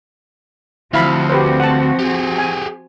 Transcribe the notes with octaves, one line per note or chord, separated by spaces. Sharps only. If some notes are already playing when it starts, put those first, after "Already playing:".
D2 F3 C4 E4 F#4 F5 B5
G4 B4 C5
F#5 A5
G4 G#4
G#5